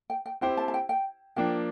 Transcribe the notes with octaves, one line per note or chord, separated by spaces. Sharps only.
G5
G5
C4 E4 G4 C5 G5
A5
A5
G5
G5
F3 A#3 D4 G5